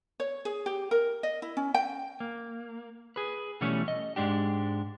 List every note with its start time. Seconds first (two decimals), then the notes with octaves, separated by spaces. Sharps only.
0.20 C#5
0.45 G#4
0.66 G4
0.91 A#4
1.23 D#5
1.42 E4
1.57 C#4
1.74 G5
2.20 A#3
3.16 G#4 B4
3.61 B2 E3 G3 A3 C#4
3.88 D#5
4.16 G#2 G#3 D4 G4